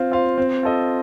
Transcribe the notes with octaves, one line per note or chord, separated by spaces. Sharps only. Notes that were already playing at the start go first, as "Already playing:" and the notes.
Already playing: C4 F4 C5 F5
F4 C5 F5
C4
F4 A4 D#5